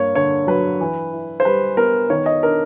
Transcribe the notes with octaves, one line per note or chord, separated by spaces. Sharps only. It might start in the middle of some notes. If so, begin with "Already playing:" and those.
Already playing: G2 A#3 C#5
D3 C#5
F#3 B4
E3
E4
C5
G3 B4
B3 A#4
D#3 C#5
D#5
D4 A#4